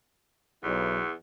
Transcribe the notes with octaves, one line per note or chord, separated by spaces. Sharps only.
B1 E2